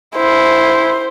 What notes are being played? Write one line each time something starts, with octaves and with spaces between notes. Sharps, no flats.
E4 C5